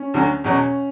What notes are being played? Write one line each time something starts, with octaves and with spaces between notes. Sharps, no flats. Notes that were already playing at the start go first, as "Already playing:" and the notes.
Already playing: C#4
D2 D3 F#3
E2 B2 F#3 C#4